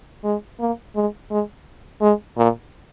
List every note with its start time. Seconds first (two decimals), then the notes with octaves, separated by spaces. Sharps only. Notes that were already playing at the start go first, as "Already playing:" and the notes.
0.24 G#3
0.60 A#3
0.96 G#3
1.31 G#3
2.01 G#3
2.37 A#2